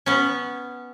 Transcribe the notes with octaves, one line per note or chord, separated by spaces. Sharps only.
B3 C#4